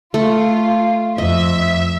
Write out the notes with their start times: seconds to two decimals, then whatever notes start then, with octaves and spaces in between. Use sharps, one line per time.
0.14 A3 F4
1.18 F2 D#5 E5